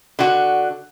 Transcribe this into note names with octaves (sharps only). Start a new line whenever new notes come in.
D3 F#4